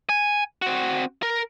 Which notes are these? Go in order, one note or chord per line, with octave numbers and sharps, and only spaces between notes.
G#5
C4 F#4
A#4